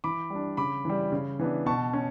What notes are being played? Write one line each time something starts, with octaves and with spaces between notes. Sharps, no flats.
E3 B5 D6
G3
D4
C#3 B5 D6
E3 G3
C#3
E3 B3 D4
B2 A5 C#6
C#4